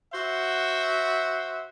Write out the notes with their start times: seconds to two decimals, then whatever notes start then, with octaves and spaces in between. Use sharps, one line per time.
0.13 F#4 C5 E5 F#5